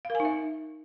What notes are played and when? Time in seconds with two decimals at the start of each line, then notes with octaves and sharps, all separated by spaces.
0.05 F5
0.10 A#4
0.15 G#5
0.20 D#4
0.25 E5